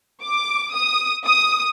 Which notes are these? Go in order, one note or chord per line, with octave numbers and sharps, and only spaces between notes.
D6
D#6
D#6